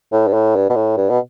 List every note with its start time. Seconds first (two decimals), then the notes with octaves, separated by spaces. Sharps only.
0.12 A2
0.28 G2
0.33 A2
0.56 G2
0.69 B2
0.76 A2
0.97 G2
1.10 B2